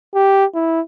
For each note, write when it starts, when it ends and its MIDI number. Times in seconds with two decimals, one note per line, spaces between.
0.15 0.45 67
0.55 0.81 64